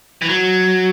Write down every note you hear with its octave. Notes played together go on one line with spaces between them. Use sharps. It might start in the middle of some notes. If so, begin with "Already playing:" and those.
E3
F#3